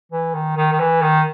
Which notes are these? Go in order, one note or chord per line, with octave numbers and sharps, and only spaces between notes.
E3
D#3
D#3
D#3
E3
D#3